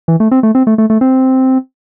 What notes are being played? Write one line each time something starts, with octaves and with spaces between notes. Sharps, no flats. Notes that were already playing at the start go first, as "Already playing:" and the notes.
E3
A3
C4
A3
C4
A3
A3
A3
C4